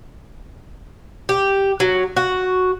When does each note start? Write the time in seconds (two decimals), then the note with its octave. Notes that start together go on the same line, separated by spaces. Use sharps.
1.29 G4
1.80 F#3
2.16 F#4